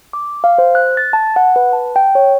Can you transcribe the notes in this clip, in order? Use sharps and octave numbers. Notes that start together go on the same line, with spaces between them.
D6
F5
C5
F#6
A6
A5
F#5
B4
A5
G5
C#5